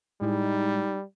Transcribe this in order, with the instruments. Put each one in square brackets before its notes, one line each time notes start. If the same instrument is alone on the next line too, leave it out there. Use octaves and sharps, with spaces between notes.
[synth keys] A2 G#3 E4 [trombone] G3 [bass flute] D#4